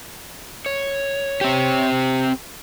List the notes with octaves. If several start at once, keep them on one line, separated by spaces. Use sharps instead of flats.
C#5
C4 G4